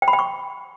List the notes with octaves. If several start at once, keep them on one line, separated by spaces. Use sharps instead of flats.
G5
B5
G5
C#6